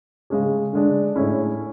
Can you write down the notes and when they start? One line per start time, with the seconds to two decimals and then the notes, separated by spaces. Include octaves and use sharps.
0.30 C#3 G#3 C#4 G#4
0.73 D3 G#3 D4
1.16 A2 G#3 C#4 E4